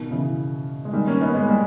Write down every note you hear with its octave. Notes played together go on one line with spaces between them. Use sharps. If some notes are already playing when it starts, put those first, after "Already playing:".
Already playing: B2 D#3
C#3 E3
G#3
D#3 G3
A#3 C#4
B3 D#4
G#3 B3
G3 A#3